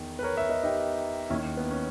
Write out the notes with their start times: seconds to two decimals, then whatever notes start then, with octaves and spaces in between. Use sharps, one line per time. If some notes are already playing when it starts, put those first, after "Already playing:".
Already playing: E2 D#3
0.19 B4
0.23 A#4 C#5
0.36 C#5 E5
0.50 B4 D#5
0.63 D#4 G4
1.30 D#2 D#3 C#4 E4
1.57 B3
1.71 C#4